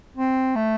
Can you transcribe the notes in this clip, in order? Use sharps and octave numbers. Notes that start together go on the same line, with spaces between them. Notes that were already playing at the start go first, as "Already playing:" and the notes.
C4
A3